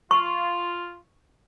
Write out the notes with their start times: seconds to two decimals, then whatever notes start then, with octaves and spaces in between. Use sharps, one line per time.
0.11 F4 C#6